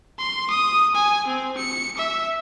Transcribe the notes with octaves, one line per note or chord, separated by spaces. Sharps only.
C6
D#6
G#5
C4
C#7
E5